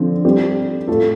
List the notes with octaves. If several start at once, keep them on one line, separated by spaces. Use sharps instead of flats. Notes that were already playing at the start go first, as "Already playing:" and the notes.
Already playing: D3 F3 C4
G3 C4 G4
A2 A3 F4 A4